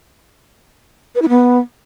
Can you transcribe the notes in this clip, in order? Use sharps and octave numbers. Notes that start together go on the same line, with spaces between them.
B4
E4
B3